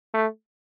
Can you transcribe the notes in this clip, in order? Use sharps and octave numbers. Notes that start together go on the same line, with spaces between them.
A3